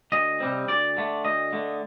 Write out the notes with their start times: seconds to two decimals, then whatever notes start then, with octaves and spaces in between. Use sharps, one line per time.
0.12 D2 D#5
0.40 C3 G3 C4
0.68 D2 D5
0.97 D3 A3
1.24 D2 D#5
1.53 D3 A3